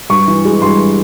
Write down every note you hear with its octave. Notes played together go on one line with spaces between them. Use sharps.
G2 C#6
E3
G#3
G2 C6